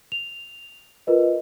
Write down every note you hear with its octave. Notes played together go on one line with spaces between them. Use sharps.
F7
F4 A#4 B4 D#5